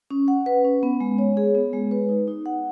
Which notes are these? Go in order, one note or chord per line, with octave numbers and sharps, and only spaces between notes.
C#4
F#5
B4
C#4
B3
G#3
C#5
G#4
B3
G#3
B4
D#4
D#4
F#5